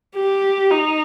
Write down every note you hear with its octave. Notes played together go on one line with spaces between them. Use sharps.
G4
D#4